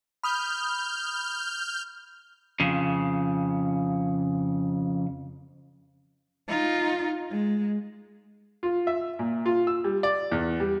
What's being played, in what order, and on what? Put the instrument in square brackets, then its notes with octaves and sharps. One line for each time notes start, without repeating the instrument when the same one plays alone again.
[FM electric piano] B5 D#6 [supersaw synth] F6 G6
[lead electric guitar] F2 C#3
[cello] D#4 F4
G#3
[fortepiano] F4
E5
A#2
F4
E6
G3
D5
E2
G3